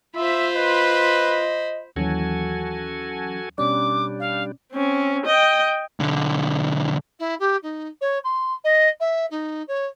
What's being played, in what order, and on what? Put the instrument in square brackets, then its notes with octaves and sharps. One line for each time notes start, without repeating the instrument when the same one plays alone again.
[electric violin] F4 [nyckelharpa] C5 B5 [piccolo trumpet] E5
[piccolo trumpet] B4 [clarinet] D#5
[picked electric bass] D#2 [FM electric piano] E3 F#3 C#4 [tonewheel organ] F#4 A4 G#5
[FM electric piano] B2 C#4 D5 [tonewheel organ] G3 D4 [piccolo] D6
[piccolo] F5
[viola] C4 C#4
D#5 G5
[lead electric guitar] B1 D3
[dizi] E4
G4
D#4
C#5
C6
D#5
E5
D#4
C#5